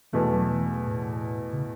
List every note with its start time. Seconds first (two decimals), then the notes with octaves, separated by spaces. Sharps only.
0.13 E2 B2 E3 A3
0.31 F#3
0.50 E3
0.87 A2
1.52 C#3